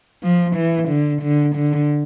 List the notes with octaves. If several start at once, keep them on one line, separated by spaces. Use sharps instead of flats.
F3
E3
D3
D3
D3